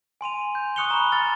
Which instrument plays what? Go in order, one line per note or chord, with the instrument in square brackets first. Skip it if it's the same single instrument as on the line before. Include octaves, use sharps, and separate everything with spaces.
[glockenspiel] G#5 C6 D#7 F7
G6
C#6 D#6 F#6 C#7 F7 G7
A#5 B5
F6 A6